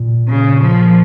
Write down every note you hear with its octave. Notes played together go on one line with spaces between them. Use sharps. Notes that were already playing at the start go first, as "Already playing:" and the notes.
Already playing: A#2
C#3
F3